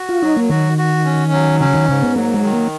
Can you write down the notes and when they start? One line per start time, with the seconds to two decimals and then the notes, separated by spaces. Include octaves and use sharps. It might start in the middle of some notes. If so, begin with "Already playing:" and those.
Already playing: F#4
0.09 F4
0.22 F#3 D#4
0.36 A#3
0.49 D#3 F#4
0.78 F#4
1.05 C#4
1.32 F#3
1.60 C#3 C#4
1.74 D#3
1.88 G#2 C#3
2.02 B3
2.16 F#3 A#3
2.34 G#3
2.43 D#3
2.53 A#3